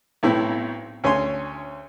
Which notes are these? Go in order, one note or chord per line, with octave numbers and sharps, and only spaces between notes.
B1 A2 C4 E4
D2 C#4 C#5 G#5 C6